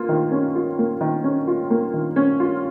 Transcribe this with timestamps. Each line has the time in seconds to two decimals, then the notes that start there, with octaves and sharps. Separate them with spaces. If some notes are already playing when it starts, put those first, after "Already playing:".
Already playing: A#3 F4
0.09 D#3
0.31 C#4
0.55 F4
0.79 A#3
1.01 D#3
1.24 C#4
1.47 F4
1.70 A#3
1.93 D#3
2.16 C#4
2.40 F4